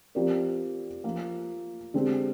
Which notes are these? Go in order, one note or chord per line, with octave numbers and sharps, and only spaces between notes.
F3 C4 G4 A#4 D5
F3 A#3 F4
D3 G#3 C4 G4